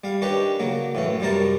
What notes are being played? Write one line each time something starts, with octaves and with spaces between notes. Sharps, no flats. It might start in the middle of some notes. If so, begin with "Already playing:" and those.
G3 F5
D#3 C#4 D4 G4 B4
C#3 F#3 A#3
A2 E3 C#4
F#2
F#2 C3 G3 C#4 A#4 A5